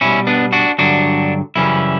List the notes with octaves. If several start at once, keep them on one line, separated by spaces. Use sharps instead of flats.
B2 G3 C#4 E4
B3 D4
D4 F#4
G2 D3 F#3 D4 F#4
F#2 C#3 E3 G3 C#4 E4